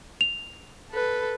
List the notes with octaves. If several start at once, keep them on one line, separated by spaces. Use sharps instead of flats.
F7
A4 B4